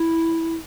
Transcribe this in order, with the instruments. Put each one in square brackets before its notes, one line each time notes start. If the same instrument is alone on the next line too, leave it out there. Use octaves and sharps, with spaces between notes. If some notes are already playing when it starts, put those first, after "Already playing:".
Already playing: [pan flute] E4